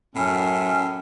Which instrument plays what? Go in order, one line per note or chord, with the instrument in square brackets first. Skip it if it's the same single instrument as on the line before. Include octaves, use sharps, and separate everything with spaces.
[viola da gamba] F#2 [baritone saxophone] A2 [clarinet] C#4